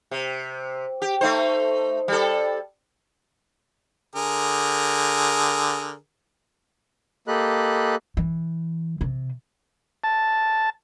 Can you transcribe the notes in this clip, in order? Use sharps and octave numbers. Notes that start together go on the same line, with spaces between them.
C3
G4
A3 D#4 C5
G3 A4
D3 G#4 A#4
A#3 G4 A4 D#5 B5 F#6
E3
C3
A5